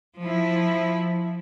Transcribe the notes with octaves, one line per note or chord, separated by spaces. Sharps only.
F3 E4